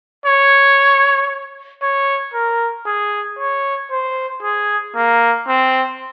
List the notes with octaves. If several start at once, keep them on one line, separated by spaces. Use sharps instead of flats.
C#5
C#5
A#4
G#4
C#5
C5
G#4
A#3
C4